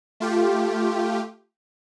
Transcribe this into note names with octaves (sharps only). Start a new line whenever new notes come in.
A3 F4 G4